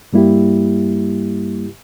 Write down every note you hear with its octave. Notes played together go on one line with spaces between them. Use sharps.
G2 G3 A#3 E4 G4